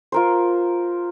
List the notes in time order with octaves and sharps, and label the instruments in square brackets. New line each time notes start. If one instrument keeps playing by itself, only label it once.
[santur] F4 A#4 C5